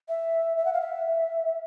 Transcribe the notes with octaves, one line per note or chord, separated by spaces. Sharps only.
E5
E5
F#5
F5
E5